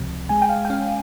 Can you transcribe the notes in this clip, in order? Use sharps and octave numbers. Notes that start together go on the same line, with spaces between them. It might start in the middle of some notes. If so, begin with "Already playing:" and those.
Already playing: C#2 C3 F3
G#3 G#5
G5
F5
G5
C#4 F5